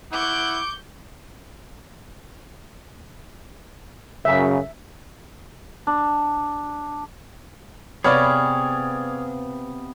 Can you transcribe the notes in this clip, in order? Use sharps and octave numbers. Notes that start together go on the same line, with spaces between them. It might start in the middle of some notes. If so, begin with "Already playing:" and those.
E4 F#5 C#6 D6 G6
F#2 C#3 E5
D4
C3 B3 G#4 C#5 D5 F5 B5 F6